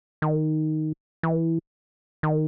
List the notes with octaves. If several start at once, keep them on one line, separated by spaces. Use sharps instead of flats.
D#3
E3
D#3